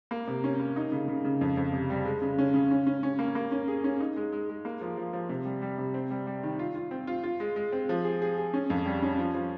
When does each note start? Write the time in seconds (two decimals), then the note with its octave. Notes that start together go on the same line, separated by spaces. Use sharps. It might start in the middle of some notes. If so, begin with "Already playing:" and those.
0.11 A#3
0.28 C3
0.44 C#4
0.60 A#3
0.76 D#4
0.92 C#3
1.08 C#3
1.25 C#3
1.41 F2
1.57 F2
1.73 C3
1.90 G3
2.05 G#3
2.22 C#3
2.38 C#4
2.54 C#3
2.71 C#4
2.87 C#4
3.03 C#4
3.19 A#3
3.35 A#3
3.52 C#4
3.68 G#4
3.84 C#4
4.00 D#4
4.17 G#3
4.33 G#3
4.49 G#3
4.65 A#3
4.81 F3
4.97 F3
5.13 F3
5.29 C3
5.45 G3
5.62 G3
5.78 C3
5.94 C4
6.11 G3
6.27 G3
6.43 D#3
6.59 F4
6.75 F4
6.91 C4
7.07 F4
7.24 F4
7.40 G#3
7.56 G#3
7.72 C4
7.89 F3
8.04 G#4
8.22 G#4
8.38 G#4
8.54 C#4
8.70 F2
8.85 G3
9.02 C#4
9.19 F3
9.35 F3